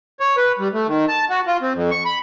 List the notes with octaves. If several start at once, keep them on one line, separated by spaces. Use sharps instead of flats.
C#5
B4
G3
A3
D#3
A5
F#4
F4
C4
F2
C#6
B5